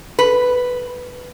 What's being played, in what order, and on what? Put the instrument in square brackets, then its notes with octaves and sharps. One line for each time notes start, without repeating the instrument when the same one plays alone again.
[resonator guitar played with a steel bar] B4